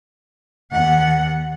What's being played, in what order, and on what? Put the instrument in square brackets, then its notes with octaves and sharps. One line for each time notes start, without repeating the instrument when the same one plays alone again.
[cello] D#2 F#5